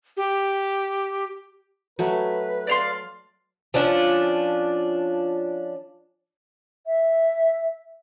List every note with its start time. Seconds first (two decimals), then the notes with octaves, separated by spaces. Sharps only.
0.17 G4
1.99 F#3 A3 B4
2.67 D5 F5 C6
3.74 F3 C#4 D4
6.87 E5